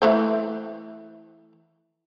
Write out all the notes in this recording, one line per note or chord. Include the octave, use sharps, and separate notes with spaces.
E3 A3 C5